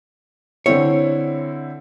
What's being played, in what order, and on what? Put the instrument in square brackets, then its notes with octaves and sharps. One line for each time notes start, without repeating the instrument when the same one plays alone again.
[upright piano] D3 C4 E4 [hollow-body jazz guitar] C#5